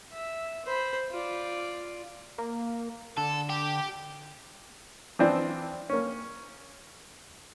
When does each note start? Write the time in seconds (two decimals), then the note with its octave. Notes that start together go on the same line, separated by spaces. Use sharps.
0.12 E5
0.66 C5 B5
1.11 F4 D5
2.38 A#3
3.18 D3 A4
3.50 G4
5.19 E3 F3 C4 D4
5.90 A#3 C#4